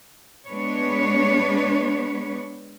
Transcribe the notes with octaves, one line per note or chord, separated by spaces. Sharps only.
G#3 B3 D4 B4 C#5